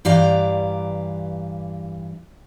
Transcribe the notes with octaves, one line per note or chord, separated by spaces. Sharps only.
G2 E3 G4 D5 F5 A#5